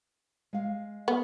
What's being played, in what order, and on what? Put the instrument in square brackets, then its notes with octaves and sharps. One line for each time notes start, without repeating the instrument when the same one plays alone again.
[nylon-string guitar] G#3 F5
[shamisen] B3